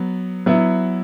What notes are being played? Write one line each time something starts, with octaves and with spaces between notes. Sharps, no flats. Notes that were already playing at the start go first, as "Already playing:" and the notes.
Already playing: F#3 B3
F#3 B3 E4